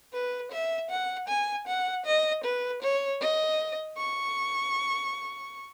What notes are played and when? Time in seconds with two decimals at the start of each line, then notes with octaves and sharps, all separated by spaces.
0.13 B4
0.51 E5
0.90 F#5
1.28 G#5
1.67 F#5
2.05 D#5
2.44 B4
2.82 C#5
3.21 D#5
3.97 C#6